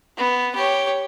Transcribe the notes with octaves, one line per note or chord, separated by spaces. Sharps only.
B3
G4 C#5